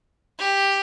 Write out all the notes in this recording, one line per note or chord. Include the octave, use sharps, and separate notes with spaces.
G4